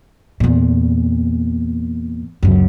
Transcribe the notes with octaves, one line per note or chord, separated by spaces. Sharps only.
E2 A#2
C#2 F#2